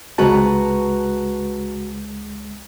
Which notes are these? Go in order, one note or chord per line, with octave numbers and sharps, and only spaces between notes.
C#2 G#3 F#4 B4 A5 A#5